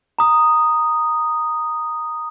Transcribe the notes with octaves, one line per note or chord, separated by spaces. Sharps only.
A#5 D#6